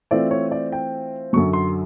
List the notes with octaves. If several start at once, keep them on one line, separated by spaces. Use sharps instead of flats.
E3 A3 C4 F4 D5
C#5
D5
G5
F#2 D3 F#3 C#6
C6